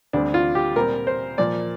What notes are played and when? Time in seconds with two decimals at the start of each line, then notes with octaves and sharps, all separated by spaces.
0.13 D2 D3 G3 C4 D4
0.34 F4
0.55 G4
0.76 A#2 G3 C4 A#4
1.07 C5
1.38 A#2 F3 A#3 D5